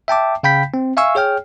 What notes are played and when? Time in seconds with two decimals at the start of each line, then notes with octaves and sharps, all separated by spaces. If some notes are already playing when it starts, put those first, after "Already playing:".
0.08 E5 G5 A5 D6
0.43 C#3 F5 G5 B5 G6 B6
0.74 C4
0.97 E5 F5 G#5 C#6 E6
1.15 G#4 C#5 G5 F6